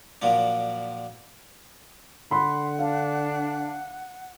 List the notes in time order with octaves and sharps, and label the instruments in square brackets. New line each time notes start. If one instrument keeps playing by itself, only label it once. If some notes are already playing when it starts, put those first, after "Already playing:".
[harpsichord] A#2 F3 F#3 D4
[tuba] D3 [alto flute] F#5 [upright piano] B5 C6
[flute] D4 [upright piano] F5